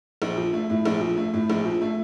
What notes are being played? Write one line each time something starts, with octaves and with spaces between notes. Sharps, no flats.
A#1
F3
A3
A2
A#1
F3
A3
A2
A#1
F3
A3